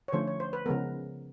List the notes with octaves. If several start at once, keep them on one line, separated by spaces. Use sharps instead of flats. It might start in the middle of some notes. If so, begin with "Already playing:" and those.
C#5
D3 F3 A3 C#4 C5
C#5
C5
B4
C#3 F3 G#3 B3 A#4